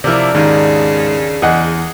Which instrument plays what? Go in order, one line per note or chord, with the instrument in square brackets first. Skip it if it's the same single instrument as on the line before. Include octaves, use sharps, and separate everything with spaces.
[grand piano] C3 F3 E4 [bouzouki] D4 A#4
[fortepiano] D#2 [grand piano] G#2 [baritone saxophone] C#3
[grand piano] E2 [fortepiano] G#4 D#5 F#5